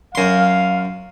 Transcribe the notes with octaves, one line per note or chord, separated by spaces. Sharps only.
F#2 F5 C6